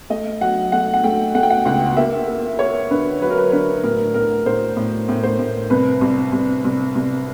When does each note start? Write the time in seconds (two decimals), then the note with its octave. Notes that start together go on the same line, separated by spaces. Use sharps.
0.10 A3 D#5
0.41 F#3 F#5
0.72 A3 F#5
0.94 F#5
1.04 A3 G5
1.35 A3 F#5
1.43 G5
1.50 F#5
1.65 C#2 F#5
1.97 A#3 E5
2.28 A#3
2.59 A#3 C#5
2.91 D3 B4
3.21 F#3 B4
3.30 A#4
3.38 B4
3.52 D3 B4
3.83 A2 A#4
4.14 A2 A#4
4.46 A2 C5
4.77 A2
5.09 A2
5.24 C5
5.39 A2
5.70 C2 B4
6.01 C2
6.32 C2
6.64 C2
6.95 C2